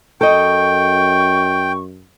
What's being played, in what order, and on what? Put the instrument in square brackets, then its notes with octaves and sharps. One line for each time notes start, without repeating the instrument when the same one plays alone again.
[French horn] F#2 [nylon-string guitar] A4 D#5 [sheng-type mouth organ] G5 [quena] C#6